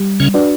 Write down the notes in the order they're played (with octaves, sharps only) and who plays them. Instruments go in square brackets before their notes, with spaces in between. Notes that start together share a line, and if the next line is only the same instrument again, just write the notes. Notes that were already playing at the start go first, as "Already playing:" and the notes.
Already playing: [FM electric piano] G3
[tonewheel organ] C#3 C#4
[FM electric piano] D4 F#4 B4 D5